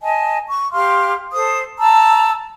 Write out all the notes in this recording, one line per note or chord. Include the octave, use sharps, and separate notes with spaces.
D#5 G#5 A5
C#6
G4 F5 C6 F6
A4 C5 D#6
A5 A#5 E6